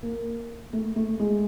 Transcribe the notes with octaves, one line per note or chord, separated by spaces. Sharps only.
A#3
A3
A3
G#3